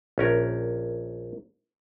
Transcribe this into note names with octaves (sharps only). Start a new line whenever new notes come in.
A#1 C#4 A#4